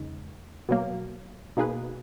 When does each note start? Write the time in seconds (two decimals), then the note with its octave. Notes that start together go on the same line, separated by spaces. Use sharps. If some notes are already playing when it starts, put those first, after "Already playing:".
Already playing: E2 C#3 G#3 D#4
0.69 B2 F#3 A#3
1.57 B2 A#3 D#4 G#4 B4